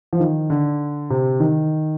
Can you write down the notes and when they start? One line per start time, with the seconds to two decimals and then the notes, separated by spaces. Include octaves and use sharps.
0.13 F3
0.20 D#3
0.50 D3
1.10 C3
1.40 D#3